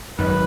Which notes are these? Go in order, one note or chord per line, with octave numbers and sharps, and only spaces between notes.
G#1 F#2 D#3 B4